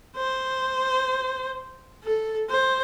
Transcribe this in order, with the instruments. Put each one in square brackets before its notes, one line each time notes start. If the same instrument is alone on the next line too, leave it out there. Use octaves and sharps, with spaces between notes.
[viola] C5
A4
C5